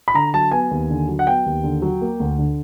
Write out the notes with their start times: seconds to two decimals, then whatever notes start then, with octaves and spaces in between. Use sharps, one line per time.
0.08 B5
0.14 D3 A#5
0.34 F#3 A5
0.52 B3 G#5
0.71 D#2
0.90 D3
1.09 F#3
1.19 F#5
1.26 B3 G5
1.46 D#2
1.64 D3
1.82 F#3
2.01 A#3
2.20 D2
2.39 D3